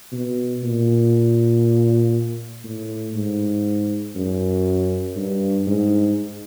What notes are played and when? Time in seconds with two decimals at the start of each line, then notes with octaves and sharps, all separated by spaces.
0.12 B2
0.63 A#2
2.64 A2
3.14 G#2
4.15 F#2
5.16 G2
5.67 G#2